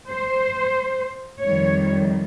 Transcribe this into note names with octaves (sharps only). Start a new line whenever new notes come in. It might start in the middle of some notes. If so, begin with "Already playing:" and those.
C5
F2 D#3 G3 C#5